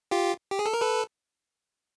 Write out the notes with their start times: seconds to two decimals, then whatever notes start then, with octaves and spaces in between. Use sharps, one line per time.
0.11 F4 G4
0.51 G4
0.59 G#4
0.66 A4
0.74 A#4
0.81 A4 B4